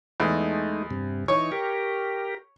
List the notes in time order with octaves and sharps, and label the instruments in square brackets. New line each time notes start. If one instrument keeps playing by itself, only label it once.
[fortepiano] E2 [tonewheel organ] G#3 A3 D#4
[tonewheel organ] G2 C3
[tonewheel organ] E3 D#4 [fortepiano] C#5
[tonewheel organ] G4 A#4